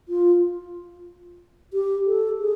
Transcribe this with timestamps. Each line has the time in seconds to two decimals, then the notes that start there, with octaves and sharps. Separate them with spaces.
0.09 F4
1.73 G4
2.06 A4
2.39 G#4